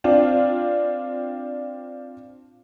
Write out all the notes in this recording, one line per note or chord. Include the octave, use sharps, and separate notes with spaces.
C4 D4 F4